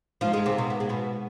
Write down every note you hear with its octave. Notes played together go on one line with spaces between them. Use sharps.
G#2 F3 F4
G#3 G#4
C3 C4
B2 B3
B3
G#3
B2 B3